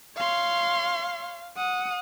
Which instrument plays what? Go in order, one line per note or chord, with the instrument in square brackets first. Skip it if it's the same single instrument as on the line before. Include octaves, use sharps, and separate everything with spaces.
[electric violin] C#5 C6 [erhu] F5
[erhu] F#5 [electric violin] D#6